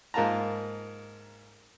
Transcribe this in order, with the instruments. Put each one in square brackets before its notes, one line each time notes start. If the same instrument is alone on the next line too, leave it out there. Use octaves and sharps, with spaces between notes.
[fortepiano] G#2 A#3 F4 A5 A#5